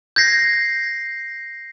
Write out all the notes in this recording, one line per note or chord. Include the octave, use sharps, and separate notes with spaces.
G6 G#6 A#6 C7